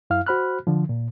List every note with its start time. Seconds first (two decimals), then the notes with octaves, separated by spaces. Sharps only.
0.10 F#2 E4 F5 F6
0.26 F#4 C5 B5 F6 F#6
0.67 D3 F3
0.89 A#2